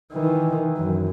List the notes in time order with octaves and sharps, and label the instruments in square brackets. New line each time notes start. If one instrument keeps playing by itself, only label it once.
[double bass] D#3 E3
F#2